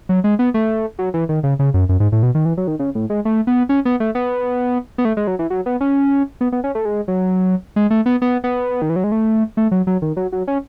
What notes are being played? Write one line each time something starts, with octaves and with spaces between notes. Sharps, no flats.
F#3
G#3
B3
A3
F#3
E3
D#3
C#3
C#3
F#2
F#2
G#2
A2
B2
D#3
E3
F#3
D#3
C#3
A2
G#3
A3
B3
C#4
B3
A3
B3
B3
A3
G#3
F#3
E3
F#3
B3
C#4
B3
B3
C#4
A3
G#3
F#3
G#3
A3
B3
B3
B3
D#3
E3
F#3
G#3
A3
A3
F#3
F#3
D#3
F#3
F#3
C#4